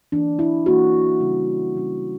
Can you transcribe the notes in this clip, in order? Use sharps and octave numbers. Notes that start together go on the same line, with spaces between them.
E3 A#3 D4
E4
E3 A#3 D4 F#4
C#3 G3 C#4
C#3 G3 C#4